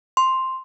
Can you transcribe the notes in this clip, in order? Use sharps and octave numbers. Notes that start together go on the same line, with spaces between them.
C6